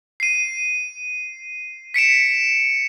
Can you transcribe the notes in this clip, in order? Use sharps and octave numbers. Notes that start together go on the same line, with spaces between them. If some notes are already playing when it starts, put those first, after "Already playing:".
C7 D#7
B6 C#7 D7 E7